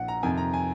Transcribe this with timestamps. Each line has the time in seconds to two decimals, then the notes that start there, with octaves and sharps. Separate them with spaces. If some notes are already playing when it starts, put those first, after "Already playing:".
Already playing: A#1 F#5
0.08 A#5
0.23 F2 C3 D#3 G#5
0.38 A#5
0.54 G#5